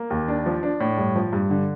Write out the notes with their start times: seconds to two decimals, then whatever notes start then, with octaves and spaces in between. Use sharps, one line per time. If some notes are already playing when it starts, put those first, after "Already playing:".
Already playing: A#3
0.10 D#2
0.28 D4
0.46 F3
0.63 D4
0.80 A2
0.98 G2
1.16 F3
1.33 G2
1.50 D3